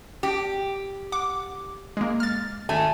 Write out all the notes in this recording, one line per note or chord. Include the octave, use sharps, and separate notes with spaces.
G4
F#5 D6
G#3 A#3
F6 A6
G#1 A3 G#5